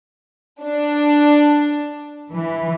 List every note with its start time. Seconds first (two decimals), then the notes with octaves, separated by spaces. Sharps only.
0.61 D4
2.32 E3